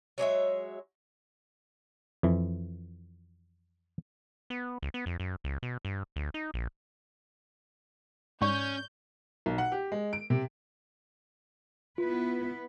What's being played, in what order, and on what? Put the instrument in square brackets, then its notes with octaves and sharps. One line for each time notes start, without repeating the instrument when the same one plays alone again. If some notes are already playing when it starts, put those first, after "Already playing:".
[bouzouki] F#3 G#3 C#5 E5
[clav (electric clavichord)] F2 E3
[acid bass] B3
C#2
B3
F2
F#2
C#2
B2
G2
D2
D#4
A#1
[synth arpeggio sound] G#2 [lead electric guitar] C#4 [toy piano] D5 C#6 [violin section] G6
[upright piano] B1
F#5
G4
G#3
D7
C3
[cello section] B3 E4 B4 [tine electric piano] F4